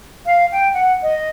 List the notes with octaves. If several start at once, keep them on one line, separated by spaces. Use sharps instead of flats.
F5
G5
F#5
D#5